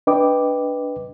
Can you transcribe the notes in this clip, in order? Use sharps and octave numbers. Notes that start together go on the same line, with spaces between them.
D4 B4 D#5 G5 D6